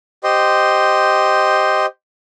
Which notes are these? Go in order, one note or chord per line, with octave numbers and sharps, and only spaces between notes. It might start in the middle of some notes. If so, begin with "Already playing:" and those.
G4 C5 D#5 C6